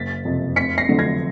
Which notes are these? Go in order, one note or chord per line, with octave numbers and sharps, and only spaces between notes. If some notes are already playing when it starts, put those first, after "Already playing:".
Already playing: F#1 A6 B6
F2 C3
F1 B6 C#7
A#6 C7
F2 D3 F#3 A3
G#6 A#6